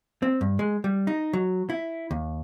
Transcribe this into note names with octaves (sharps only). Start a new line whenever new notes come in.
C4
G2
G#3
G3
D#4
F#3
E4
D#2